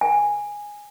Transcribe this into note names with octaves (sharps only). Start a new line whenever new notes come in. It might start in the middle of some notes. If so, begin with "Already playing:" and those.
G#5